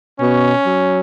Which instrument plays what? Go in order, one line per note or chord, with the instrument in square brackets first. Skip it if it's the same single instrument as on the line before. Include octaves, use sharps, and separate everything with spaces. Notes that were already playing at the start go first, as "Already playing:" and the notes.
[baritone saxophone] B2 [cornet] C#4
[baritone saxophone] F#3